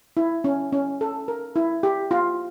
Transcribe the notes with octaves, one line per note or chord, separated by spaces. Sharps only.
E4
C#4
C#4
A4
A#4
E4
G4
F4